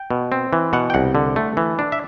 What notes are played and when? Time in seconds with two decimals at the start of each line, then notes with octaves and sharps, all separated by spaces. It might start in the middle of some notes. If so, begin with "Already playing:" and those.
Already playing: G5
0.11 B2
0.32 C4
0.53 E3
0.73 B2 F#5
0.90 G5
0.94 C2 F#5
1.15 D3
1.36 A3
1.57 E3
1.79 D4
1.92 E5